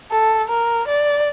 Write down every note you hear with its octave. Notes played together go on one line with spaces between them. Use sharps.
A4
A#4
D5